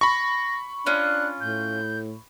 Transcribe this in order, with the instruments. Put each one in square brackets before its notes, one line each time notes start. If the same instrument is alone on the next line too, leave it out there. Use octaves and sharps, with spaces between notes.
[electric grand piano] B5 C#6 [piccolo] A#6
[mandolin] C#4 F4 [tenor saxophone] D4 [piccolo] F#6
[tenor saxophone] A2 [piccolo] G6